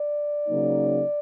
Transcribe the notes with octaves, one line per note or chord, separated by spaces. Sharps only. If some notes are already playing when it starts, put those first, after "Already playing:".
Already playing: D5
C#3 F#3 A#3 D#4